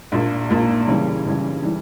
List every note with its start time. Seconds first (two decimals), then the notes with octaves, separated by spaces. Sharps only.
0.12 A#1 A#2 A#3
0.50 A#1 A#2 A#3
0.87 C#3 E3 G3 C#4
1.25 C#3 E3 G3 C#4
1.63 E3 G3